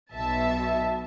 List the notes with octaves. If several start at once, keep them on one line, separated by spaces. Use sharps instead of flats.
B1 B2 E5 A5